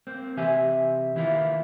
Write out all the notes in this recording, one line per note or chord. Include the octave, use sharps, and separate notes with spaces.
A#3 C4
C3 E3 G4 E5 G#5
D#3 E3 A#3 E4 F4